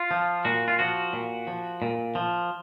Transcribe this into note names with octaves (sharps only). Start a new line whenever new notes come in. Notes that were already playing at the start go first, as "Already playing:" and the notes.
Already playing: F4
F3
A#2 F#4
F4
F3 F#4
A#2
F3
A#2
F3